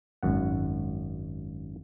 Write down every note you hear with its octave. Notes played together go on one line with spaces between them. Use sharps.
G#1 F#2 F#5